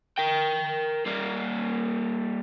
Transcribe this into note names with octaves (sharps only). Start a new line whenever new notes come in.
A#4 G5
G3 A#3